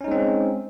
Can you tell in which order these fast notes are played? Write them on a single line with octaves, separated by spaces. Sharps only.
C#4 D#4 G#3 C4